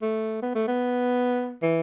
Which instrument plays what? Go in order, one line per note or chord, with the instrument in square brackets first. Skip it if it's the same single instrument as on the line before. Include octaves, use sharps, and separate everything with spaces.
[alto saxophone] A3
B3
A3
B3
E3